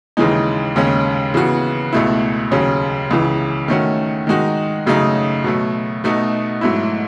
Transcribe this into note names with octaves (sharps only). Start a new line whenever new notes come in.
D#2 C#3 E3 G#3 D#4
D#2 C#3 G#3 C#4
C#3 E3 B3 F#4
C#2 B2 A3 E4
D#2 C#3 F#3 C#4
C#2 C#3 E3
D#3 A3 C#4 F#4
D#3 G#3 D#4 F#4
F#2 C#3 F#3 A3 D#4
B2 F#3 A3
B2 A3 D#4 F#4
G#2 F#3 A3 E4